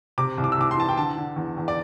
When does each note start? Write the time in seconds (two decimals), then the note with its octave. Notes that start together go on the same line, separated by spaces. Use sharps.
0.18 C3 D6
0.38 C2
0.44 D6
0.52 E6
0.57 C2 D6
0.71 C6
0.77 E3 A5
0.88 G5
0.97 D3 A5
1.17 D3
1.36 E2
1.57 E2
1.68 D5